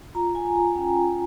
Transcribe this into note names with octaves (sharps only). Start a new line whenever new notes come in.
F4 A#5
F4 G#5
F4 A#5
C#4 G5
F4